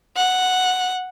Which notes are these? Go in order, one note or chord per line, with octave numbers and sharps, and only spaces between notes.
F#5